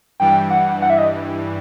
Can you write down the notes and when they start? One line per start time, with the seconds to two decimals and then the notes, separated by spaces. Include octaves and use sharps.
0.19 G2 E3 G3 G5
0.50 F#5
0.82 F#5
0.90 E5
0.98 D#5